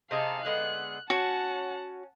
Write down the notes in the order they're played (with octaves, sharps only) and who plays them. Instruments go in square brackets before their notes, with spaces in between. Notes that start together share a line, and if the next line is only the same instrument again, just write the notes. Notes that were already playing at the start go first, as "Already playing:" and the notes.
[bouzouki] C3 D#4 G#4 [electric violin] F5 A5
[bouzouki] D3 G#3 B3 [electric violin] F#6
[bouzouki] C#4 [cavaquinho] F#4 [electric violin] F#5 A5